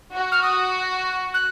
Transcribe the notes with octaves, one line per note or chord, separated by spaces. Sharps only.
F#4
F6
D#6
F#6